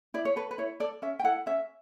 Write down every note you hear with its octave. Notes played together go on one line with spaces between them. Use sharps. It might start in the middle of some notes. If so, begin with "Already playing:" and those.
E4 D5
C#5
A4 B4
B4
E4 C#5
A4 D5
C#4 E5
G5
E4 A4 F#5
C#4 E5